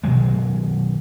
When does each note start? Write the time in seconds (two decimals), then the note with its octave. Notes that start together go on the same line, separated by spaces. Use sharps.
0.03 B2 D#3 F#3 G#3